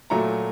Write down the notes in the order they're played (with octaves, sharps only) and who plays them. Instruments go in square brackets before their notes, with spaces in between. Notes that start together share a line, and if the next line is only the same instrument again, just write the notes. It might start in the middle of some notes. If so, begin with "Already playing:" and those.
[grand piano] A#2 F#3 A3 A#5